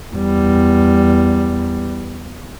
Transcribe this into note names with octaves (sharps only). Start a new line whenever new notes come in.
E2 G3